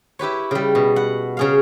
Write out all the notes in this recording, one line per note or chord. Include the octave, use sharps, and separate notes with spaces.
E4 G4 B4 C#5
C#3 G3
B2
F#5
C#3 G#4 F5